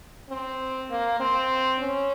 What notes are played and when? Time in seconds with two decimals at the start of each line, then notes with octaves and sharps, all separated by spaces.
0.29 C4
0.90 A#3
1.20 C4
1.80 C#4